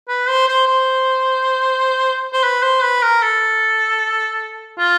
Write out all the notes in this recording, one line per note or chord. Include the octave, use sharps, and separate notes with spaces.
B4
C5
C5
C5
C5
B4
C5
B4
A#4
A4
F4